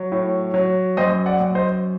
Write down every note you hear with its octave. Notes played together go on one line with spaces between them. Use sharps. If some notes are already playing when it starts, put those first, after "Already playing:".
Already playing: F#3
A2
F#3
F#2 C5 D#5
D5 F#5
F#2
C5 D#5